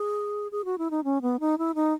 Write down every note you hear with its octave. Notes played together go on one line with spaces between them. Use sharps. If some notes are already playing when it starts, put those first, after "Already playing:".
Already playing: G#4
G#4
F#4
E4
D#4
C#4
B3
D#4
E4
D#4